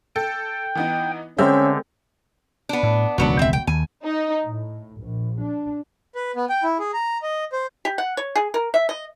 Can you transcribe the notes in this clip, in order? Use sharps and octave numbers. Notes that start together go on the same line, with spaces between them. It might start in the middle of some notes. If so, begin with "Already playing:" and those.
A4 G5
E3 B3 D#4
D3 G#3 C4 C#4 A#4 E5 G6
B3 D4
A2
E1 C#2 D#3 F#3 B3 D4
C4 E5
G5
D#2 G#5
D#4
A2
A#1
D4
B4
B3
G5
E4
G#4
A#5
D#5
C5
G4
F#5
C#5
G#4
A#4
E5
D#5